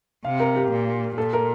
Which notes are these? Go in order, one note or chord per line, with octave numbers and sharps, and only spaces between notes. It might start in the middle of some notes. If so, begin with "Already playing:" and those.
C3 F5
A#4
G4
A#2
A#2 A4
A#4